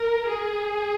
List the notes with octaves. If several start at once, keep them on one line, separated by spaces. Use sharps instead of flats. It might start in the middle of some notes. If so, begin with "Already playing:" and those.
Already playing: A#4
G#4